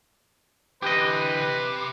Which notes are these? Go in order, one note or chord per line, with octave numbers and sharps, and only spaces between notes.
D3 E3 G4 B4 D#5
C3